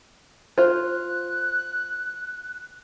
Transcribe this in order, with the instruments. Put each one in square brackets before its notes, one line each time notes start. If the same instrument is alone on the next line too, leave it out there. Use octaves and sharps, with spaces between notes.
[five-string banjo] F4 C5 [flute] F#6